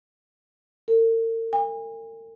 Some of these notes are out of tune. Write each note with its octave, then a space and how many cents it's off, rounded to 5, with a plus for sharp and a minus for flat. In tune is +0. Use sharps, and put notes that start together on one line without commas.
A#4 -45
G#5 -40